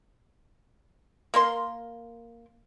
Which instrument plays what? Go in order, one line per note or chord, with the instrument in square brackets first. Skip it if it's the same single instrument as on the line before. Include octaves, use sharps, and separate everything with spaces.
[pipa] A#3 A#4 C6